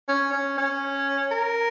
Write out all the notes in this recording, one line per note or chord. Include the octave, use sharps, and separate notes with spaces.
C#4
C#4
C#4
A#4